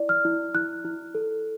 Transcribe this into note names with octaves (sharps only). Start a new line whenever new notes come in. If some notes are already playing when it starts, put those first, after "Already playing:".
Already playing: E4 D5
F6
E4
E4 F#6
E4
A4